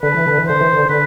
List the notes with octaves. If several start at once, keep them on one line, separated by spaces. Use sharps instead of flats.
D3 B4
E3
D3
E3
D3 C5
E3
D3
D3 B4